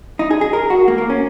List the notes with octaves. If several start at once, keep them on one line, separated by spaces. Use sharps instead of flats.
D#4
G#4
G#4
A#4
F#4
A#3
A#3
C#4